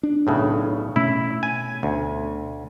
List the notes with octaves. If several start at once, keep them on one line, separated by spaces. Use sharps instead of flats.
D4
B1 A2 C#3
B2 A3 C#4 E4
G#5
D2